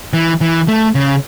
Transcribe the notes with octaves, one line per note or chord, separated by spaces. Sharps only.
E3
E3
A3
C#3